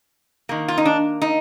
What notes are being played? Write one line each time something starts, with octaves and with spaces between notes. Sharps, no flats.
D#3 A#3
F4
D#4
D4
D#4